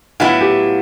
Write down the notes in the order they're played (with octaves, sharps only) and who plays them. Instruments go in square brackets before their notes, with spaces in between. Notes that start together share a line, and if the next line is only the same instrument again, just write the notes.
[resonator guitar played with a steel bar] A2 F#3 B3 E4 [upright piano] F4
[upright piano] G4